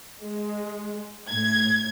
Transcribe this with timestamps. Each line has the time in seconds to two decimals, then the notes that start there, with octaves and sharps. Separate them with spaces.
0.24 G#3
1.30 A2 G#6